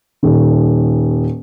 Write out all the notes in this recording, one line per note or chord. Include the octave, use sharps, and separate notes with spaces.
D#1 D#3